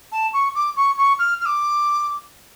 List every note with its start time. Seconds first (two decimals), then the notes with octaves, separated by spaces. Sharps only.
0.12 A5
0.33 C#6
0.55 D6
0.76 C#6
0.98 C#6
1.19 F6
1.40 F6
1.45 D6